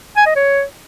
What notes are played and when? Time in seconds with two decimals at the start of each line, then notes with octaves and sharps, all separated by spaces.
0.17 G#5
0.26 D#5
0.36 C#5